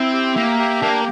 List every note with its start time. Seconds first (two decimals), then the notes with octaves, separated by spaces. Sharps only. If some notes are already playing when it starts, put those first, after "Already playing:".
Already playing: C4 E4
0.13 G4
0.36 A#3 E5
0.59 G4
0.81 A#3 D4